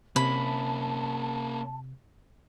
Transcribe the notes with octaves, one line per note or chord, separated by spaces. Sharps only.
C3 A#3 C#4 A5 B5